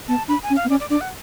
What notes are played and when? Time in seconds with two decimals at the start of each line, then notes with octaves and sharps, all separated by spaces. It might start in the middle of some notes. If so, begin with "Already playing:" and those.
0.08 B3 A5
0.28 D4 B5
0.43 G#5
0.50 C#4
0.56 F5
0.64 B3
0.69 C#4 D5
0.80 D5
0.90 D4 D5
1.01 F#5